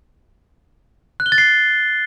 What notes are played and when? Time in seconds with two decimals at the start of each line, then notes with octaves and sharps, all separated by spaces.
1.20 F#6
1.26 G7
1.32 A6
1.38 C7